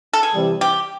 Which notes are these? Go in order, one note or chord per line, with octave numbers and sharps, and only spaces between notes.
A4
G#4
C3 E3 G3 C4
G4